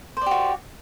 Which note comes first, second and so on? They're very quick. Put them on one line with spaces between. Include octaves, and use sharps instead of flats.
C5 D5 G4 F#4